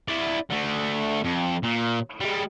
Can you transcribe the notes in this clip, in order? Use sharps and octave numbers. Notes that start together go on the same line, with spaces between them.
E4 D5
D3 A3
F2
A#2
G3 G#3